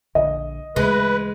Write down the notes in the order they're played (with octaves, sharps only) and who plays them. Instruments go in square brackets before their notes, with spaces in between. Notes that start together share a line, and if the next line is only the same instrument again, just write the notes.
[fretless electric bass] A#1 D3 [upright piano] D#5
[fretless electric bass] D2 C#3 E3 [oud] G#3 [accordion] B4